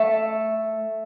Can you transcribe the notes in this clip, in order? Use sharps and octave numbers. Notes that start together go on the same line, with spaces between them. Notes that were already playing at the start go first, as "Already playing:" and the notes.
Already playing: A3 A4